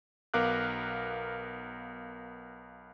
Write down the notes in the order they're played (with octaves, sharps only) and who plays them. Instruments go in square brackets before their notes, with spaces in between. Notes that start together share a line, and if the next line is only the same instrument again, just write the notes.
[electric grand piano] B1 B3 A#4 F5 D6 F#6